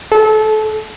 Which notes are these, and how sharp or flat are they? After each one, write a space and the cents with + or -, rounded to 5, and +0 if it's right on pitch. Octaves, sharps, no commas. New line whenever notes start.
A4 -25